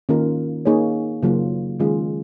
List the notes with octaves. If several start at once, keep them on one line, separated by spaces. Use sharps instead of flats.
D#3 A#3 C#4 F4 A#4
A#3 D#4 G#4 C#5
C#3 F#3 A#3 F4
D#3 G#3 C#4 F4 G#4